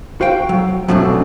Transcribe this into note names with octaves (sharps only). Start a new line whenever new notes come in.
F#4 C5 F5 G5
F#3
F#2 B2 F#3 A3 C4 D4